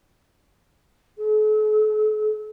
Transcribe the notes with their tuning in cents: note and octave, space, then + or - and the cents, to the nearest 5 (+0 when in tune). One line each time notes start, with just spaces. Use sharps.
A4 -45